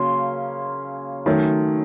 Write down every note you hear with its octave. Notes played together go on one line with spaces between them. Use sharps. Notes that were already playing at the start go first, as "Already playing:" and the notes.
Already playing: C#3 F#3 A#3 C#4 C6
D#3 F#3 A3 C#4